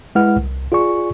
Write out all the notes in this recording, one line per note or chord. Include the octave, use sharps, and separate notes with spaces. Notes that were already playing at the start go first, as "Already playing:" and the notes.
G#3 E4 B4 F#5 F6
C2
F4 G#4 D5 G#5 C#6